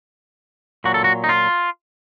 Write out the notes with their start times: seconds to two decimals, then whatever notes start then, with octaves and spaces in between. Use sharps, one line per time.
0.84 A#2 F#3 F#4
0.94 A4
1.04 F#4
1.24 D#4
1.29 F4